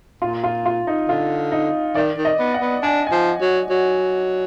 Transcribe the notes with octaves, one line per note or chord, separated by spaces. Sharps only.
A#2 F4
F4
F4
D#4
D3 F4
D#4
D#3 D5
D#3
D#5
B3
F#5
B3
D4 G#5
G#5
F3
F#3
F#3